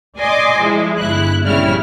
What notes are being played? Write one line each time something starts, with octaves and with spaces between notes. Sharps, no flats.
D5 D#5 G#5 C6 D6
F3 G#3 E4
G1 E4 F#6
A#1 C#3 G3 E4 F6